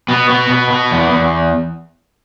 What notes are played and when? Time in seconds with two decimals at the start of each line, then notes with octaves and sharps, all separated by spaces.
0.08 B2 B3
0.30 B3
0.50 B2
0.70 B3
0.91 E2
1.11 E2